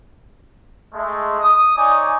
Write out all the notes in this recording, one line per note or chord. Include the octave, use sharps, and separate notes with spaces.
G#3 A3
D#6
D#4 C#5 D5 G#5 D6 D#6